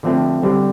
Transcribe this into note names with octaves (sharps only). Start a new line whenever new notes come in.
D3 F3 A3 C4
D3 G3 C4